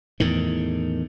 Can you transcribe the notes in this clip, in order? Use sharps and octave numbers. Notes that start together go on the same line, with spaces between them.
E2 A2 D#3